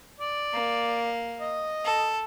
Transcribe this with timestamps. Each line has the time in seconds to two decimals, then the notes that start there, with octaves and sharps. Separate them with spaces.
0.20 D5
0.53 A#3
1.40 D#5
1.85 A4